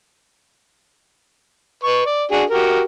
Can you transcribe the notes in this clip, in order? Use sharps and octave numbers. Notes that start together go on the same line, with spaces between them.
B4 C#6
D5
D4 F#4 G#4
F#4 G4 A#4